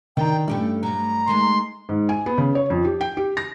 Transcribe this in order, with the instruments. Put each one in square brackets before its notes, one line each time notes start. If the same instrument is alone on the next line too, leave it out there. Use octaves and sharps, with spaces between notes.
[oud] D3 [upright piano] D#3 A#5 [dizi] G5
[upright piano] G2 [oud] A3 C#4 E4 [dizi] G5
[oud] F#3 A3 [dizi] A#5
[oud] D#3 G#3 A3 [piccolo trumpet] C6
[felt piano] G#2
G#5
B3
C#3
C#5
F2
G4
G5
G4
A#6